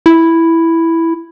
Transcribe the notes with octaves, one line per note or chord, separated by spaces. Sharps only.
E4